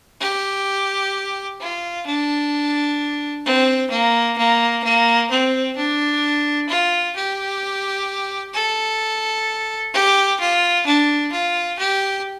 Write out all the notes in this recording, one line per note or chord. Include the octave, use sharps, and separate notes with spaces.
G4
F4
D4
C4
A#3
A#3
A#3
C4
D4
F4
G4
A4
G4
F4
D4
F4
G4